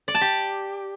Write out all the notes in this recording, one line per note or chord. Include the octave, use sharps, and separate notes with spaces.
D5
A5
G4